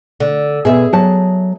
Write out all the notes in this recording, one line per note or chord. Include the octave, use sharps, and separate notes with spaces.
D3
B2 G#4 E5
F#3 A5